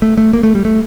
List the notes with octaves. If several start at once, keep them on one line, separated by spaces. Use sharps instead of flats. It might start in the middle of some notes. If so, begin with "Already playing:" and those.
A3
A3
A#3
A3
G3
A3